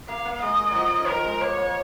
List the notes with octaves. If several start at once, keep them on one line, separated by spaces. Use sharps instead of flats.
A#3 F5
A#3
G#3 D#5
F3 F#3
D#3
F3 A#4
G#3
A#3 C#5
A#3